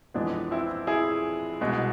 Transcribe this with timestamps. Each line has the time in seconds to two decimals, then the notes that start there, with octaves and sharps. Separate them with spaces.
0.14 F2 E3 G#3 B3 D4
0.51 C4 E4
0.87 E4 G#4
1.61 C2 B2 G#3